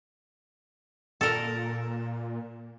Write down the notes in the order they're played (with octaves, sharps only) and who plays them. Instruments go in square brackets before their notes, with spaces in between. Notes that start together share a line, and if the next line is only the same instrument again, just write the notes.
[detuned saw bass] A#2 [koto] A4 A#4